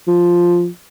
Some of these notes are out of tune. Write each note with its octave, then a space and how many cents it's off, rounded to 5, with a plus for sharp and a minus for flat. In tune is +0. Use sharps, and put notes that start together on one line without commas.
F3 +0